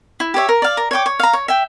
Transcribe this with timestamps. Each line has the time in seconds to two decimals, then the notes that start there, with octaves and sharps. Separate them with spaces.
0.20 E4
0.34 G4 C#5 E5
0.49 A#4
0.62 D5 F5
0.77 A#4
0.91 C#5 G5 D6
1.06 C#5
1.19 F5 A#5
1.33 C#5
1.48 E5 G5